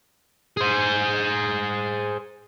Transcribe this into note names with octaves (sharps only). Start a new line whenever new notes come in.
G#4 C5